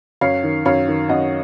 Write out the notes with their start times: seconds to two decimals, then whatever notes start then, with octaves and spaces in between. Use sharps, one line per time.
0.21 F#2 C#5 F5
0.43 D#3
0.65 F#2 C#5 F5
0.88 D#3
1.09 F#2 D#5 F#5